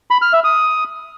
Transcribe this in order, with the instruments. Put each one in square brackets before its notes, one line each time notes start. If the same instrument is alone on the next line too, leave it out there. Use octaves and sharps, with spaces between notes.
[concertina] B5
F6
E5
D#6